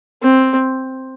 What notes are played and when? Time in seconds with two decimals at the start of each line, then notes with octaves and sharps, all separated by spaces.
0.22 C4